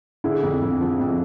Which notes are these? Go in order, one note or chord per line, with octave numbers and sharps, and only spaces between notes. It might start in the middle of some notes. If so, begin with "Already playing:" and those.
D3 E4 G#4
F2
F2
F3
F2